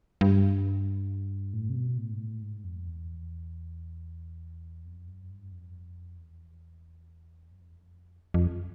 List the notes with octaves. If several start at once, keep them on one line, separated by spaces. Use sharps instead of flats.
G2
A2
C3
B2
A2
G#2
A2
G#2
F2
E2
F2
F#2
G2
F2
E2
F#2
F2
E2
F2
F2